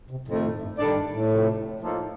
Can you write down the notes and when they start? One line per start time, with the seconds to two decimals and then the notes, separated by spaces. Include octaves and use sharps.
0.11 C3
0.28 F2 A2 D#3 A3
0.44 A2
0.62 G2
0.78 A2 D#3 G3 D4 A4 D5
0.95 G2
1.12 A2
1.30 C3 F3 A3
1.80 F3 A#3 D#4 A4